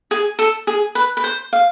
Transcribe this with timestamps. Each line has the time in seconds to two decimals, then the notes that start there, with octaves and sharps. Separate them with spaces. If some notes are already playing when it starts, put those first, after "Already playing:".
0.11 G#4
0.39 A4
0.67 G#4
0.95 B4
1.17 B4
1.24 C5
1.53 F5